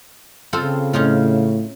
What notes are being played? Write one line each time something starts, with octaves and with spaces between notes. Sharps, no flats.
C#3 C4 F4 A4
A2 C#4 D#4 F4